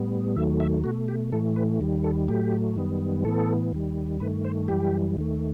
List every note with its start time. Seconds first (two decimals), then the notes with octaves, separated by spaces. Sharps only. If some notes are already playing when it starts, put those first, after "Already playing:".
Already playing: A2 G3 B3
0.36 D#2 D#3 F#3 A3 E5
0.60 E5
0.84 B2 A3 F#4
1.08 G4
1.32 A2 E3 A3 A4
1.56 B4
1.81 D#2 D#3 G3
2.04 A4
2.28 A2 F#3 A3 G4
2.76 F#2 D#3 G3 B3
3.24 A2 E3 B3 A4
3.73 D#2 D#3 G3
4.20 G2 D#3 A3 B4
4.45 C5
4.68 F#2 E3 G3 G4
5.17 D#2 D#3 A3